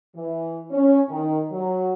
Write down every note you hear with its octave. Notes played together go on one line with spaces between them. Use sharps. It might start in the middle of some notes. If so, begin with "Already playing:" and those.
E3
C#4
D#3
F#3